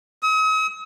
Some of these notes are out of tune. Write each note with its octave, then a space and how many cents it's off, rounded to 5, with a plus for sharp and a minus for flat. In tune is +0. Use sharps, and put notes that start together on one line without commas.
D#6 +45